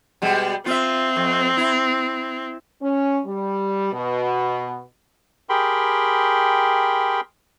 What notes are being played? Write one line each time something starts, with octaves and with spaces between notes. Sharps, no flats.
B2 G3 G#3
C4 F4 E5
F2
E4
C#4
G3
B2
G4 G#4 A#4 G5 B5 C6